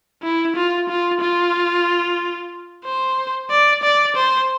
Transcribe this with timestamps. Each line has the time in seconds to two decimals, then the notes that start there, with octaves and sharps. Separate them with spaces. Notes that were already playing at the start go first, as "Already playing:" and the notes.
0.22 E4
0.55 F4
0.89 F4
1.20 F4
2.84 C5
3.50 D5
3.83 D5
4.16 C5